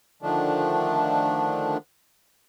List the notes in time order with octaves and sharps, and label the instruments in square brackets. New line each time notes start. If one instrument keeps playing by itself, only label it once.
[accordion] D3 D#3 F3 A3 D4